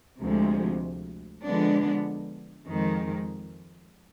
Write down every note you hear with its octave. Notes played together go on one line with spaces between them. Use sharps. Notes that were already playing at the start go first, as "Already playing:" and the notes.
D2 C3 F3 G#3
D3 F3 G#3 B3 D4
F2 D#3 G#3